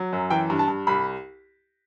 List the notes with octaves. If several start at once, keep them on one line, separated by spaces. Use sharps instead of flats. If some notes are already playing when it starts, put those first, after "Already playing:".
Already playing: F#3
F#2
E3 G5
G2
A5
G2
C2 B5